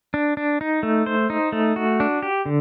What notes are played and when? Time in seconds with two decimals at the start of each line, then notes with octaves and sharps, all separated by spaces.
0.14 D4
0.37 D4
0.61 D#4
0.83 A3
1.06 C5
1.30 D#4
1.52 A3
1.76 F#4
2.00 D4
2.23 G4
2.46 D3